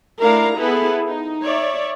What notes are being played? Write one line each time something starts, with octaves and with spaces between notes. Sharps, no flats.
A3 D4 E4 A#4 F5 A#5
B3 E4 G#4 A4 B4
D#4
C#5 D5 E5